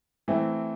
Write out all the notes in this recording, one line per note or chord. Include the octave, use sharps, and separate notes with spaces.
E3 A3 C4 E4